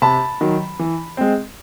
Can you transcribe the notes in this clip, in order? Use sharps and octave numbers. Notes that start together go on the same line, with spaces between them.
C3 A5 B5
D#3 F#3
E3
G#3 C4